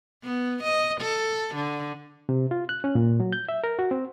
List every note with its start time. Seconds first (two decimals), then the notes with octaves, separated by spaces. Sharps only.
0.23 B3
0.63 D#5
1.01 A4
1.55 D3
2.29 C3
2.51 F4
2.69 F#6
2.84 C#4
2.95 A#2
3.20 F#3
3.33 G6
3.49 E5
3.64 A#4
3.79 F#4
3.91 C4